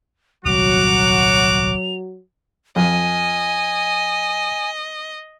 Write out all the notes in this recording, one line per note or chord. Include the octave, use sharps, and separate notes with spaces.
D#1 C2 A#2 F#3 F#4 F#5 D6 F7
F2 D#5 G#5